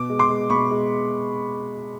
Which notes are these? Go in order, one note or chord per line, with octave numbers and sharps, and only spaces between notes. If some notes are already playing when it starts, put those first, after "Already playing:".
Already playing: B2 D6
G#3
C6 D6
G#3
B2 B5 C#6
G#3